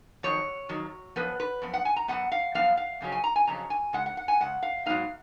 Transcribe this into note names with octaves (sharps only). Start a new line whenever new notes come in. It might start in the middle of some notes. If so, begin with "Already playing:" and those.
F2 D#3 F#3 C#5
F2 D#3 F#3
F#2 F3 B3 B4
B4
F#2 F3 B3
F#5
G#5
A#5
F#2 F3 B3 F#5
F5
F#2 F3 B3 F5
F5
F2 C#3 F#3 C#4
G#5
A#5
G#5
F2 C#3 F#3 C#4 A#5
G#5
C#3 G#3 F#5
F#5
F#5
G#5
C#3 G#3 F#5
F5
G#2 F#3 B3 D#4 F5